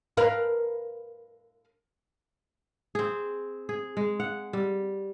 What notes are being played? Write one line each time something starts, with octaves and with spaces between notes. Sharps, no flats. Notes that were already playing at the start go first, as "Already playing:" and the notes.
A#4 B4 F5
C4 G#4
G#4
G#3
F#5
G3